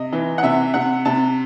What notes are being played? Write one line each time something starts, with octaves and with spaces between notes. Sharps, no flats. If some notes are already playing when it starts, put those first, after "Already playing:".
Already playing: C3 D#5
E3
F#5
C3 E5
C3 F#5
C3 A5